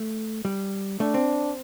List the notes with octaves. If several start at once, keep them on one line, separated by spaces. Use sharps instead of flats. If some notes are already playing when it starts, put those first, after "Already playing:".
Already playing: A3
G3
A3 D4
C4